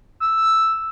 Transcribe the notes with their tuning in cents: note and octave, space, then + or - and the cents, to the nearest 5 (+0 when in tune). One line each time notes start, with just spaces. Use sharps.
E6 +0